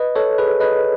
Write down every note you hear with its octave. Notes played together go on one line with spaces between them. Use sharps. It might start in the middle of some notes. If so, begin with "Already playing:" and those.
Already playing: B4 D#5
A4 C#5
G#4 B4
B4 D#5